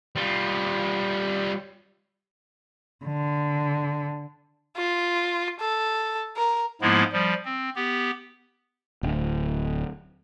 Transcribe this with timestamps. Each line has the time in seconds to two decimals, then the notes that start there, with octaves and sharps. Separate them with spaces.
0.16 G3 F4
3.05 D3
4.77 F4
5.60 A4
6.37 A#4
6.81 G#2 F3 G#3 A#3 B3 E4
7.12 F3 G3
7.45 C4
7.75 B3 G4
9.03 D1